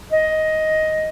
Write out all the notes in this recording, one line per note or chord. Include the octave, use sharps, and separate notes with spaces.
D#5